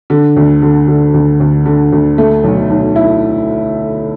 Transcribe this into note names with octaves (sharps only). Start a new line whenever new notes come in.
D3
D2
D3
D3
D2
D2
D3
D2
A3
B1
B1
E4